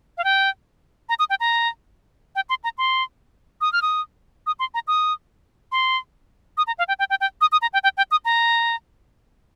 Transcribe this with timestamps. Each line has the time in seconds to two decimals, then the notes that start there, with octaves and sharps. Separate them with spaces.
0.18 F5
0.24 G5
1.09 A#5
1.19 D#6
1.30 G5
1.40 A#5
2.36 G5
2.49 C6
2.64 A#5
2.78 C6
3.61 D#6
3.73 F6
3.82 D#6
4.47 D#6
4.59 C6
4.74 A#5
4.88 D#6
5.72 C6
6.57 D#6
6.67 A#5
6.79 F5
6.88 G5
6.99 G5
7.10 G5
7.21 G5
7.41 D#6
7.52 D#6
7.62 A#5
7.73 G5
7.84 G5
7.97 G5
8.11 D#6
8.25 A#5